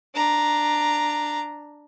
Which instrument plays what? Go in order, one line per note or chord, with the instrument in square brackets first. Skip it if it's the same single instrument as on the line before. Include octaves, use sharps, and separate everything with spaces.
[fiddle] D4 A#5